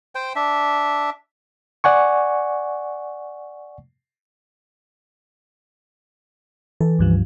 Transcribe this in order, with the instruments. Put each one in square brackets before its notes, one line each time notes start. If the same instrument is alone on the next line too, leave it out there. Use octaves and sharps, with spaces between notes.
[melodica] C5 G5
D4 E5
[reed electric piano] D5 F#5 G#5 C#6
[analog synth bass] E3 [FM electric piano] A4
[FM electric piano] C#2 G2 F3